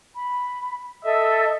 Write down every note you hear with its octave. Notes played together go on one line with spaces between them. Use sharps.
B5
A4 D#5 E5